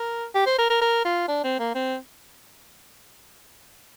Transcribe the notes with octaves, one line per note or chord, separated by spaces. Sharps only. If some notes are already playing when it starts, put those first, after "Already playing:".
Already playing: A#4
G4
C5
A#4
A#4
A#4
F4
D4
C4
A#3
C4